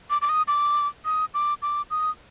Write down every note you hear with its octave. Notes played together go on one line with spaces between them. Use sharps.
D6
D6
D#6
D6
D#6
D6
D6
D#6